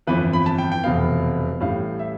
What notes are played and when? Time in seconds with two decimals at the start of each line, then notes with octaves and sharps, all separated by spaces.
0.07 G1 F2 E3 B4
0.33 B5
0.46 A5
0.58 G5
0.72 G5
0.84 F1 E2 B2 B3 F5
1.60 A1 A2 G3 F5
1.99 E5